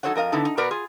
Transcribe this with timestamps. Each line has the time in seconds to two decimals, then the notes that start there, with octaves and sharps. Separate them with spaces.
0.03 F#3 D#4 A4 C5 C#5 F#5
0.16 F2 A#4 D#5 F5
0.32 D3 B3 D#4 E4 A4
0.45 D#4
0.57 B2 F#4 A#4 B4 D5 A#5
0.71 F4 G#4